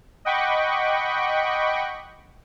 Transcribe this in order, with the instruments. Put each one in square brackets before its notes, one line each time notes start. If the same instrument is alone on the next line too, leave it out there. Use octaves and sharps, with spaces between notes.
[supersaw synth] D#5 F#5 G5 B5 C#6 D6